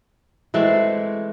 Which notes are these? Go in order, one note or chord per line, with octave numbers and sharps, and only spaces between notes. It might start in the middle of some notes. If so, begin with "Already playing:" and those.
E3 G#3 A3 C4